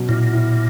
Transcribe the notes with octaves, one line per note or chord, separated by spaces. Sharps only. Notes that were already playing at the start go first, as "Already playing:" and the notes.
Already playing: B2 F#3 C#4
A#2 E4
E4